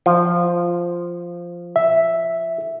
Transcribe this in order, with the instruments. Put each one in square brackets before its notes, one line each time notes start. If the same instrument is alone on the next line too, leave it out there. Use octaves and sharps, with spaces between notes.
[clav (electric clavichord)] F3
[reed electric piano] E5